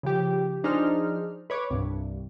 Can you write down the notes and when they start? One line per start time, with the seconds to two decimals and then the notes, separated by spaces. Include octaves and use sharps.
0.03 C#3 F3 G4
0.64 F3 D4 D#4 G#4 C5 F6
1.50 B4 C#5 D6
1.70 C2 G2